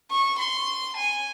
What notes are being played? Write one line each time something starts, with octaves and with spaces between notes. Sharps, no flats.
C#6
C6
G#5